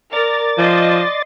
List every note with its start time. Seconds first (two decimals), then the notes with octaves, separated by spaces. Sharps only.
0.13 A#4 D5 A6
0.58 F3 D#5 C6